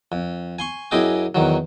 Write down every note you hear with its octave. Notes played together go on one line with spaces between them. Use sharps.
F2
G#5 C6 C#6
F#2 E4 G#4 D#5 G5 D6
E2 D#3 F#3